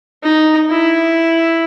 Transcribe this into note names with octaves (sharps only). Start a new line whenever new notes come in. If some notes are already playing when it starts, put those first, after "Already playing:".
D#4
E4